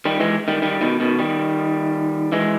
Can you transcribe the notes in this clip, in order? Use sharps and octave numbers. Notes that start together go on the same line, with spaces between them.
D#3 G3
E3 G#3
D#3 G3
D#3 G3
B2 D#3
B2 D#3
D#3 G3
E3 G#3